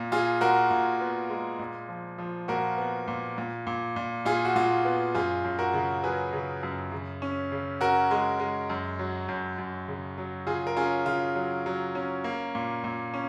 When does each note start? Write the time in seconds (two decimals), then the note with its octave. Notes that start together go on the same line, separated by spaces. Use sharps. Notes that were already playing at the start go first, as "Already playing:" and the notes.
Already playing: A#2
0.12 A#2 F4 G#4
0.41 A#2 F#4 A#4
0.71 A#2
1.01 B3
1.30 G#3
1.59 A#2
1.89 F3
2.18 F3
2.48 A#2 F#4 A#4
2.78 B3
3.08 A#2
3.38 A#2
3.67 A#2
3.96 A#2
4.25 A#2 F4 G#4
4.45 F#4
4.56 A#2 F4
4.85 B3
5.15 F#2 F4 G#4
5.44 F#2
5.59 F#4 A#4
5.74 C#3
6.03 F#3 G#4 B4
6.33 C#3
6.63 F#2
6.92 C#3
7.22 C#4
7.52 C#3
7.81 C#4 F#4 A#4
8.11 G#3
8.40 G#3
8.70 F#2
8.99 F#3
9.28 F#2
9.58 F#2
9.88 C#3
10.18 F#3
10.47 C#3 F4 G#4
10.67 A#4
10.76 C#4 F4 G#4
11.06 C#3 F4
11.35 F#3
11.66 F#3
11.95 C#4
12.24 A#3
12.55 A#2
12.84 A#2
13.14 C#4